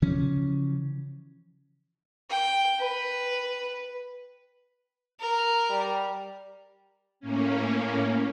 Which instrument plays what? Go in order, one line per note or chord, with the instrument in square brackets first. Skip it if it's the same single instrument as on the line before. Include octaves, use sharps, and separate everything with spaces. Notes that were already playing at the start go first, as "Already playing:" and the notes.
[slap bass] C#3 E3 F3 C#4
[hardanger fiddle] G5
B4
[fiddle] A#4
[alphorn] G3
[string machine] A2 A#3 C#4